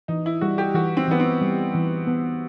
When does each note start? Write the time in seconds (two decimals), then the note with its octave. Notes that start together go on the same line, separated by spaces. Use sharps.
0.08 E3 D#4
0.26 E4
0.41 G3 F#4
0.58 G4
0.74 E3 F#4
0.97 C4
1.08 E3 B3
1.20 C4
1.41 G3
1.75 E3
2.07 B3